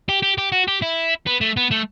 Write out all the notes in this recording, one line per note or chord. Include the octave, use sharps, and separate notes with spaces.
G4
G4
G4
F#4
G4
E4
B3
A3
B3
A3